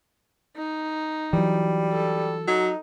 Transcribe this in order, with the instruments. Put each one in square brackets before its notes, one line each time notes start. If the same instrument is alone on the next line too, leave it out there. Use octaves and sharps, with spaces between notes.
[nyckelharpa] D#4
[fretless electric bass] E3 F#3 [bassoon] G3
[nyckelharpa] A4
[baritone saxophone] F#3 [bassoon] D#4